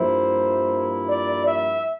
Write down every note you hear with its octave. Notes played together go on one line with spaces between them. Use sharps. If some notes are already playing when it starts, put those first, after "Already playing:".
Already playing: G2 F3 A#3 E4 C5
D5
E5